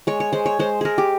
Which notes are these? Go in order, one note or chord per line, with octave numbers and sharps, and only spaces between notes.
G#3 C#5
C#5
G#3 C5
C#5
G#3 C5
G#3 G#4 A#4
G4